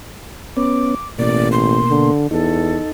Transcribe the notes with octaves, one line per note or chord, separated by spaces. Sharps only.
B3 C#4 D6
A1 B2 A#3 D5
C6
D3
E2 D#4 A4